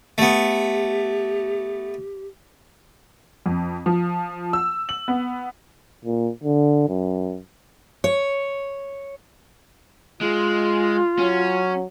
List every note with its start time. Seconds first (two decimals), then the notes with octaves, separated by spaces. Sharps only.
0.18 A3 B3 G4
3.46 F2
3.86 F3
4.53 E6
4.89 F#7
5.08 B3
6.05 A#2
6.44 D3
6.89 F#2
8.04 C#5
10.21 G#3 F4
11.18 F#3 C#4